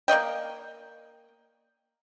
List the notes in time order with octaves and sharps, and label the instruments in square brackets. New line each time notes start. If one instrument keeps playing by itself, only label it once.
[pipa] A#3 D5 D#5 G5